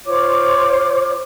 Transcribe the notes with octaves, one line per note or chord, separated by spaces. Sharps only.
F4 C5 C#5 D6